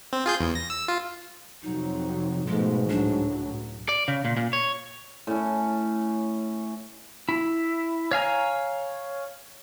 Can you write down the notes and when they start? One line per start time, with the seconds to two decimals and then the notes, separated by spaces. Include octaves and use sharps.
0.13 C4
0.26 F4 G#4 G6
0.40 E2
0.55 A#6
0.70 E6
0.88 F4
1.63 F2 C3 F#3 D#4
2.46 G#2 B2 F3 G#3 A3
2.90 C#2 A2 F#3 D4
3.89 D5
4.08 C#3
4.25 A#2
4.37 A#2
4.53 C#5
5.27 A2 C#4
7.29 E4
8.11 C#5 F5 G#5 A#5